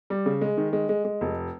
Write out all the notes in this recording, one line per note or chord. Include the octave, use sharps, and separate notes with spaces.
G3
C#3
G#3
D#3
G#3
G#3
G#3
F1